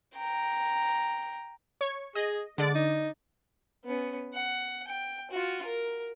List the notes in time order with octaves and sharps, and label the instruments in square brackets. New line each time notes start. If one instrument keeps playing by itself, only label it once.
[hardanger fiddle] G5 A#5
[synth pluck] C#5 C#6
[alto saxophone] G#4 [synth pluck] D#5
[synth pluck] D3 D5 A6 [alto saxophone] G#3
[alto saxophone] D#4
[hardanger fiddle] B3 C#4
F#5
G5
F4 F#4
A#4